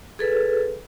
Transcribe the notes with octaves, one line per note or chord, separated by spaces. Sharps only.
G#4 A4 B4